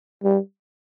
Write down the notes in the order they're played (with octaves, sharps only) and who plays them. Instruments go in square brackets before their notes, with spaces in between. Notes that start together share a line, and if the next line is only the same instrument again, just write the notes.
[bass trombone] G3